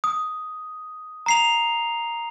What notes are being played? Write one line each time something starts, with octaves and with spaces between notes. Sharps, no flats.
D#6
A#5 C7 F7